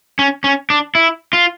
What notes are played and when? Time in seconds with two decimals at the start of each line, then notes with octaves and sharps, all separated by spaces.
0.19 C#4
0.44 C#4
0.70 D4
0.95 E4
1.33 F4